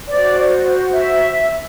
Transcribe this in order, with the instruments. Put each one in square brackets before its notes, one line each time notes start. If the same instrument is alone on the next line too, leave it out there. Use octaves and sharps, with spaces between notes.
[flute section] F#4 C5 D5
E5